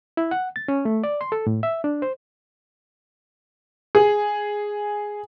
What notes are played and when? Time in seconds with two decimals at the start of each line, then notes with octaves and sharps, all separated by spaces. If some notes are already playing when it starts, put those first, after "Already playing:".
0.17 E4
0.31 F#5
0.56 A6
0.68 C#4
0.85 A3
1.04 D5
1.21 C6
1.32 A4
1.47 A2
1.63 E5
1.84 D4
2.02 C5
3.95 G#4